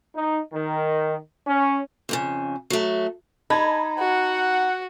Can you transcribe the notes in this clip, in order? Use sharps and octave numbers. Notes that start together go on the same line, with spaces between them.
D#4
D#3
C#4
F2 A2 C#3
F#3 A3
D#4 A5 B5 G#6
F#4 F#5